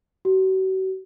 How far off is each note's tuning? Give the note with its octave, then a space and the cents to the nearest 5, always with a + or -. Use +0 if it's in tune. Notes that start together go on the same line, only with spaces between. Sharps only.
F#4 +40